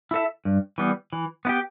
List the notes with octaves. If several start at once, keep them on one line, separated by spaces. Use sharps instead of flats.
E4 A4 E5
G2
E3 G3 B3
E3
B3 E4 G4